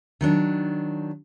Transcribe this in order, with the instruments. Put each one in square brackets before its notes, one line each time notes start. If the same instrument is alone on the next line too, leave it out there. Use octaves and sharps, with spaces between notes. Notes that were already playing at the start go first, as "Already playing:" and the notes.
[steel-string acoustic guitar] D#3 F#3 D4